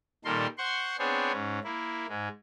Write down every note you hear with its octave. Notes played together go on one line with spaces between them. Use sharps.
A#2 D#3 G3 A4 A#4 C6
C5 F#5 C6 C#6
B3 C4 D4 G#4 C5 C#5
G#2 C#4
A#3 E4
G#2 G#3